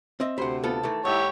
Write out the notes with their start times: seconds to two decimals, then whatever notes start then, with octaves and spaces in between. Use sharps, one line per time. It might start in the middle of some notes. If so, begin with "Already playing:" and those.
0.20 C4 D#5 E5
0.38 D2 C3 C5 F#5 B5
0.64 B3 F4 A4
0.83 D#3 E3 A3
1.05 G#2 E4 G4 C#5